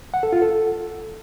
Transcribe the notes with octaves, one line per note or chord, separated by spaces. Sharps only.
F#5
A4
F4
A4